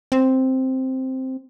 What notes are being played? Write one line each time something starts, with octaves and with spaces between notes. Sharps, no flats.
C4